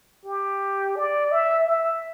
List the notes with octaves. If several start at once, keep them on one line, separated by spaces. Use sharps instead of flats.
G4
D5
E5
E5